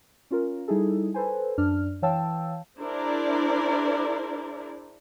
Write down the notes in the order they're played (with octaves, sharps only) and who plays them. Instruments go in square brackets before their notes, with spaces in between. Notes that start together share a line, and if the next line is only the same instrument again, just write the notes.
[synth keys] C#4 F4 A#4
G3 D#4 E4 G#4 A4
A4 B4 C5 G#5
F#2 D4 F6
E3 C#5 F5 G5 A5 E6
[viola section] D4 E4 G#4 A#4 C5 D5